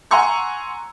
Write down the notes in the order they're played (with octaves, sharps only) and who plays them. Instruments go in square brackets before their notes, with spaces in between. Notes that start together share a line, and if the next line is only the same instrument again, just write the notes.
[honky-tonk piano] F#5 G#5 A#5 C6 C#6 E6